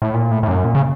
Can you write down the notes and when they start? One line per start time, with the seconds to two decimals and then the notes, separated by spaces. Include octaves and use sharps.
0.02 A2
0.14 A#2
0.31 A2
0.43 A2
0.48 F#2
0.64 A#2
0.75 C#3